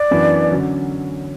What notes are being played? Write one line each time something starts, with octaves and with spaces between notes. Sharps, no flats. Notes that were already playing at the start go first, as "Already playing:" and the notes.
Already playing: D5
F#2 E3 B3 D4
D3 F#3 C#4